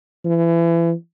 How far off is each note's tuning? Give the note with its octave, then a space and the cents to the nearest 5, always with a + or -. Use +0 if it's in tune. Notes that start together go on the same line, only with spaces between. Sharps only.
E3 +30